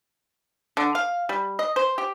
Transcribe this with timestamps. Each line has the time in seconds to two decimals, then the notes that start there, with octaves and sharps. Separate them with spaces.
0.77 D3
0.95 F5
1.29 G3
1.59 D#5
1.76 C5
1.98 G4